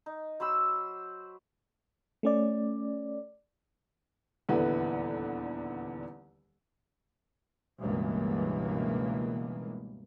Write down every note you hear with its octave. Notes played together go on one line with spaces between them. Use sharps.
D#4
F#3 C5 B5 E6
A3 C#4 D5
D#1 E2 D3 B3 E4 B4
C#2 G2 B2 E3 A#3